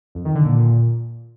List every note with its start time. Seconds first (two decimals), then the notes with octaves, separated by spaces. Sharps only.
0.15 F2
0.25 D#3
0.35 D3
0.45 A#2